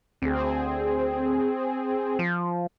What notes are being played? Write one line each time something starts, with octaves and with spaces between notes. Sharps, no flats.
D2 C4 G#4
F3